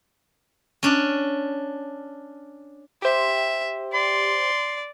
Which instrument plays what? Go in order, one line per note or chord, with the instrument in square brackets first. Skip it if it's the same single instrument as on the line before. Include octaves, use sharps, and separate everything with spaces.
[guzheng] C#4 D4
[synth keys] G4 C5 [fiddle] E5
[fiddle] D5 [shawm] C6